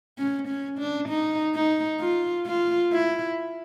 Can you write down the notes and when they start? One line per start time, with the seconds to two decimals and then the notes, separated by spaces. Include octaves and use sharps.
0.18 C#4
0.48 C#4
0.79 D4
1.09 D#4
1.55 D#4
2.00 F4
2.46 F4
2.92 E4